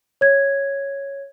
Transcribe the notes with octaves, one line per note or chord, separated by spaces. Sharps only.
C#5 G#6